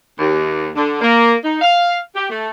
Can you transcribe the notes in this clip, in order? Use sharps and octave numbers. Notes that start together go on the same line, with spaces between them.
D#2
D3
A#3
D#4
F5
G4
A3